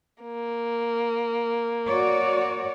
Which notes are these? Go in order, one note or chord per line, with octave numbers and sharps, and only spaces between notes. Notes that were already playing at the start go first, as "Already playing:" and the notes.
A#3
F#4 C#5 D5